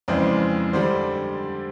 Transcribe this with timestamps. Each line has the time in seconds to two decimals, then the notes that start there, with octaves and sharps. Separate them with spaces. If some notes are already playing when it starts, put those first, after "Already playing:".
0.08 F2 C#3 E3 G#3 C5 D5
0.73 D3 G3 C5 D5